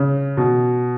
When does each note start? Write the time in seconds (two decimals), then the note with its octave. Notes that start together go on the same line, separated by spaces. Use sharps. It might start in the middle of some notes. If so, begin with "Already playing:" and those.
Already playing: C#3
0.37 B2